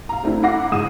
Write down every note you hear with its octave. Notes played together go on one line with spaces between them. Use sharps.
F5 A#5
A3 C4 D4 E4
E4 F5 F#5 D6 A#6 C7
C#2 G#2 D#6 E7